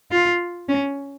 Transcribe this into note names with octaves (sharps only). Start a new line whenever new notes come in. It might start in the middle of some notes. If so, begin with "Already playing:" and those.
F4
C#4